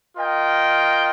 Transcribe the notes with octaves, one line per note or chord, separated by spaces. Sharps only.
F4 A#4 D#5 G5